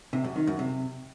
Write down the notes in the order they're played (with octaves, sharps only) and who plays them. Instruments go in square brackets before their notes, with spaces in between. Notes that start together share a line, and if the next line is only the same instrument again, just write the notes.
[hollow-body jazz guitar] C3
F#2
D#3
F#2
C3